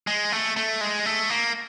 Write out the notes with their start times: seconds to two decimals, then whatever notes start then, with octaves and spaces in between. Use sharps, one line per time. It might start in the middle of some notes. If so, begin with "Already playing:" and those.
0.07 G#3
0.32 A3
0.56 A3
0.81 G#3
1.06 A3
1.30 A#3